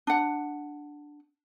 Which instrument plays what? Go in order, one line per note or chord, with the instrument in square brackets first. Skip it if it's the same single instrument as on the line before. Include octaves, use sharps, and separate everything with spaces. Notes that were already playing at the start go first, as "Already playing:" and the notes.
[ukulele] D4 F#5